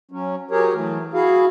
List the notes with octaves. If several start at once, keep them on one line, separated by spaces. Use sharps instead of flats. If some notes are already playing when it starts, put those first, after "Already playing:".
F#3 C#4
F#3 G4 G#4 A#4 C#5
E3 F#3 A3
E4 F#4 G#4 F5